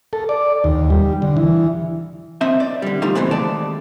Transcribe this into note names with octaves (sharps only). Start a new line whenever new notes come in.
A4
D5
D#2
G3
D3
E3
C4 D#5 E5
D5
D3 G3
F3 G3 A3 D#4 F4 G4
A#2 C#3 E3 A3 C4
D#2 G#3 A3 D5 A5